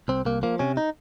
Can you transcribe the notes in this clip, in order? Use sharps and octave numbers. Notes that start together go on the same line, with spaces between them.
C2 C4
C2 A#3
F3 A#3
C3 C#4
D#4